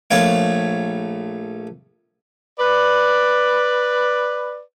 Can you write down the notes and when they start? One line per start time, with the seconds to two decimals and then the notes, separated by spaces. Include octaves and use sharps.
0.11 A#1 A3 C#5 F5
2.59 B4 D5